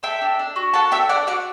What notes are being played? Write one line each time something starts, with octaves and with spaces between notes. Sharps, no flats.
A4 E5 G5
D4
D4
F#4
A4 F#5 A5
D4 E5 G5
D4 D5 F#5
F#4 D5 F#5